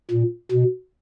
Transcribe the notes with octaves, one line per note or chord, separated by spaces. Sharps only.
A#2
B2